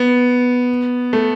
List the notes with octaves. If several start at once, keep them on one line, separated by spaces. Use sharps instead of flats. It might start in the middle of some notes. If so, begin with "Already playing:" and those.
Already playing: B3
A3